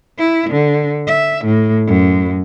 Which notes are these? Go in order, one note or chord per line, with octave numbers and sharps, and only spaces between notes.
E4
D3
E5
A2
F#2